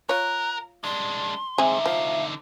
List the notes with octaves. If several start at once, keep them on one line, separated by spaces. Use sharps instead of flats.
F4 A#4 C#5 F#6
G#3 D4 C6
D3 G#3 C4 D#4 G#4 E5
F3 F5